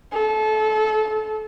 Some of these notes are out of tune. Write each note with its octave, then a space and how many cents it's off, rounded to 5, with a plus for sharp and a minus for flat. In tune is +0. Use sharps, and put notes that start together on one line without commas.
A4 -30